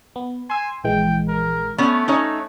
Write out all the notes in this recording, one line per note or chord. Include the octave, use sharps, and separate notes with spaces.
B3
G#5 C6 E6
A#1 E3 G#3 G5
A#4
A3 B3 C#4
C#4 D#4 C#5 F#6